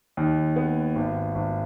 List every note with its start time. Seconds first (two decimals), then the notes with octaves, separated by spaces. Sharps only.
0.17 D#2
0.56 B3
0.96 G#1
1.35 G#1